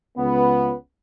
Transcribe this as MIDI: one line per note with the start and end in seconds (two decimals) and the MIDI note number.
0.17 0.72 37
0.17 0.72 59